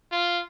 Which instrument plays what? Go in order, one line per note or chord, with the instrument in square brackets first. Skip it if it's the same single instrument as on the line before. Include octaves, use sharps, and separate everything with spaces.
[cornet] F4